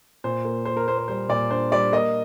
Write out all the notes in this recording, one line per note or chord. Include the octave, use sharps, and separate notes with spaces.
A#2 C5
A#3
A#3 C5
A#4
A#3 C5
C5
G3 C5
A#2 D5
D4 C5
G3 D5
A#3 D#5